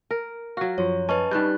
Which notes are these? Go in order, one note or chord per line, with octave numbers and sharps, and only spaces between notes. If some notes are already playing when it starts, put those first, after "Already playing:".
A#4
F#3 F#4 F5
F#2 F3 C#5
C#4 B4 D#5 A5
G2 G3 D#4 F#6 G6